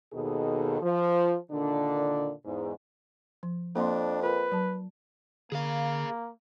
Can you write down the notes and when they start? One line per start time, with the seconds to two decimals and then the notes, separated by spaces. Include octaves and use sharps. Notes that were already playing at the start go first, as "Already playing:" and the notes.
0.13 D#2 B2 D#3 G#4 A4
0.82 F3
1.51 A#2 D3 D#3 D4
2.45 E2 G#2
3.43 F3
3.75 F2 A#3 C4 D4 C6
4.22 F4 A#4 B4
4.52 F#3 A5
5.52 D3 A#3 G#4 F5